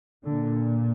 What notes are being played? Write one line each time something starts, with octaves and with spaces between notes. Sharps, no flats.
A#2 D3